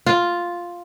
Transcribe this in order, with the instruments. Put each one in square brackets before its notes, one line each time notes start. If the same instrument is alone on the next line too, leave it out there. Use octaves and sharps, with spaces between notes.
[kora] F4